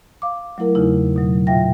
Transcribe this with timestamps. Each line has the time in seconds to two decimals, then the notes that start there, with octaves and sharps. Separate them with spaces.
0.22 F5 D6
0.58 F#3 A3 E4 A#4
0.75 E2 C#3 D#4 E4
1.16 B2 F#3
1.47 A#2 F4 E5 F5 G5 A#6